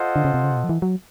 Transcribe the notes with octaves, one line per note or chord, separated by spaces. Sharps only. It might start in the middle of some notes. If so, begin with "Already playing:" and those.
Already playing: F4 A4 C5 D#5 F#5
D3
C#3
C3
C#3
C3
B2
F3
E3
F#3